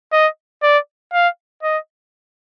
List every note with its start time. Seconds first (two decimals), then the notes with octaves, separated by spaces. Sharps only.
0.12 D#5
0.63 D5
1.13 F5
1.63 D#5